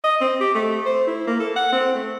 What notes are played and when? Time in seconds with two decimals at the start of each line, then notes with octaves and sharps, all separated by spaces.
0.04 D#5
0.21 C4
0.41 G4
0.54 A3
0.86 C5
1.07 E4
1.27 A#3
1.40 A4
1.56 F#5
1.72 C4
1.95 A3